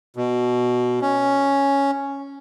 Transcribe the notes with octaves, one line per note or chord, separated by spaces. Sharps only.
B2
C#4